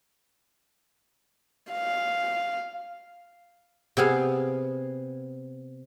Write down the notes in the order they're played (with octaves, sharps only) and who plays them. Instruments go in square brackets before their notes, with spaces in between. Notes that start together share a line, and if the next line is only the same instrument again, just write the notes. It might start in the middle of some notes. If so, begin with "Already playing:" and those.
[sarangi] F5
[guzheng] C3 B3 G#4 F5